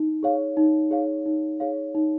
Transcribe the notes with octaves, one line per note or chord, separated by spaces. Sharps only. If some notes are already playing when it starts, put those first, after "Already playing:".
Already playing: D#4
G#4 C#5 F5
D#4
G#4 C#5 F5
D#4
G#4 C#5 F5
D#4